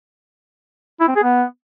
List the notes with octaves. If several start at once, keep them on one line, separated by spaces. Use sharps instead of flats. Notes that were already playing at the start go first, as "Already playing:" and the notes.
E4
C4
G#4
B3